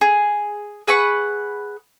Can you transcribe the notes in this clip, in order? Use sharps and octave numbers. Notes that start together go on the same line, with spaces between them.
G#4
G#4 B4 F#5 C#6